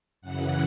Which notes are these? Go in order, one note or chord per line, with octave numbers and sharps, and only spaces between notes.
F#2 C#3 E3 F#5